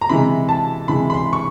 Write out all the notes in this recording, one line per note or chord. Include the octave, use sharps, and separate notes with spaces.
A#5
C3 E3 G#3 B5
A5
C3 E3 G#3 B5
B5
C6
C#6